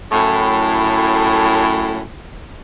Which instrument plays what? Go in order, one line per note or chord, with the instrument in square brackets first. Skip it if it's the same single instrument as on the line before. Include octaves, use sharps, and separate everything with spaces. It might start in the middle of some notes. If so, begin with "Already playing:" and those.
[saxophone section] F#2 A2